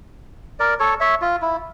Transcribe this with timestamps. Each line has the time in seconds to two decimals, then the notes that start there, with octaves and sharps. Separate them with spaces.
0.60 A#4 D5
0.79 A4 C#5
1.00 C#5 E5
1.22 F4
1.42 E4